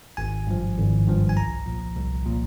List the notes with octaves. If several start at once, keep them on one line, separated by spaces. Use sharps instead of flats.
G#1 G#5
G2 F3
G#1
G2 F3
G#5
C2 A#5
A#2 F3
C2
A#2 F3